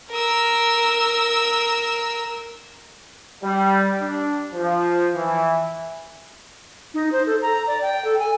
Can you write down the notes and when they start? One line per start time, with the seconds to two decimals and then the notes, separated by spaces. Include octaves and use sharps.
0.11 A#4 E6
3.42 G3
3.98 D4
4.53 F3
5.14 E3
6.94 D#4
7.12 C5
7.27 A4
7.42 A#5
7.67 D5
7.82 G5
8.05 A4
8.19 G#5